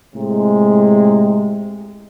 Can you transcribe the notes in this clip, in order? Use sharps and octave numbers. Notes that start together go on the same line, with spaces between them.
A2 C3 G#3